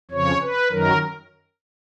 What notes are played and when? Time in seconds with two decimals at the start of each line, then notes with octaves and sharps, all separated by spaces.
0.11 F2 C#3 F3 C#5
0.41 B4
0.71 F#2 D#3 F#3 A#4